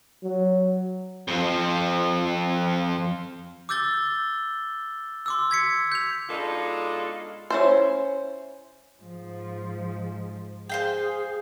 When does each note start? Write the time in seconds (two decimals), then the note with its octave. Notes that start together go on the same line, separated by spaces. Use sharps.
0.23 F#3
1.28 F2 F3
3.69 D6 E6 G6 A6 G7
5.26 C6 D6 E6
5.51 G#6 B6 C#7
5.92 G6 F7
6.29 B2 G#3 D4 D#4 F4 A4
7.50 C#4 E4 C5
9.01 G#2 F3
10.69 G#4 C5 F5 G5